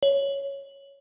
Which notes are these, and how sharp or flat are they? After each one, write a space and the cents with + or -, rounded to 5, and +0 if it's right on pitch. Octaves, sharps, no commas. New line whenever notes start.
C#5 +0